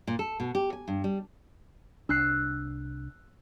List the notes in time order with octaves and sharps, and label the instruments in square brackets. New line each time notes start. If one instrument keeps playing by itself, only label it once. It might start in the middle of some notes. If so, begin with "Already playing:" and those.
[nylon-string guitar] A#2
A4
B2
G4
G#5
G2
G3
[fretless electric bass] C2 D4 [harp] E6 F#6 C7